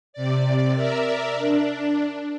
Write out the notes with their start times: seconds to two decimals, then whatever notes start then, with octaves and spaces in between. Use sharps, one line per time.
0.13 C3 D5
0.75 A#4 D5 E5
1.36 D4